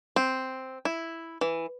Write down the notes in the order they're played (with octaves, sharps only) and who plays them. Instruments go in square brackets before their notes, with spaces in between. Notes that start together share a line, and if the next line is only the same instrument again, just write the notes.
[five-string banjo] C4
E4
E3